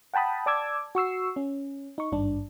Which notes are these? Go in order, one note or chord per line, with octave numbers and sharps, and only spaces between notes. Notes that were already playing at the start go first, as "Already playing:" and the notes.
F#5 G5 A5 B5 D#6
D5 A5 D6 E6 G#6
F#4 C#6 E6 C7
C#4
D#4 C#6
G#1 G2 D4